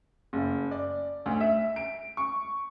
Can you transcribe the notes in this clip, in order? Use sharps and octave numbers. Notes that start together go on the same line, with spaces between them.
F#1
D5
D2
E5
D7
C#6